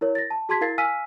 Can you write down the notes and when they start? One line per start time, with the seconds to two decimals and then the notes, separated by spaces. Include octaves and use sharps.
0.01 E4 A#4 C#5
0.15 A6 A#6
0.31 A5
0.49 F#4 G#4 A5 C6 G#6 B6
0.61 E4 A#4 F5 G#6 A6 C7
0.78 F5 G#5 E6 F6 B6 D#7